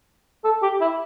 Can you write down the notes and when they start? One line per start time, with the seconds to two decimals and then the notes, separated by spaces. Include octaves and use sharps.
0.44 A4
0.62 G4
0.81 E4